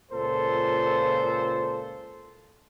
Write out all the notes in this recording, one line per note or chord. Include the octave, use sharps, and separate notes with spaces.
C#2 A#2 A4 C5